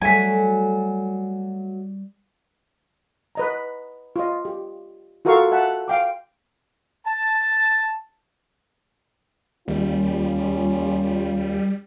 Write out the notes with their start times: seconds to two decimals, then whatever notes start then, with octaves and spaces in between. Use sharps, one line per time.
0.02 F#3 G3 A3 G#5 B6
3.35 B4 D#5 A#5
4.16 F4 D#5
4.45 G4
5.25 F4 F#4 A4 A#4 F5 C#6
5.52 E5 F#5 A5
5.88 F5 G5 D6
7.06 A5
9.68 D#2 G3 A#3 C#4 F4